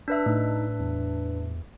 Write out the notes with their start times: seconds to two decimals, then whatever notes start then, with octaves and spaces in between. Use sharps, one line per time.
0.08 D4 B4 E5
0.26 A2 D#4
0.80 E2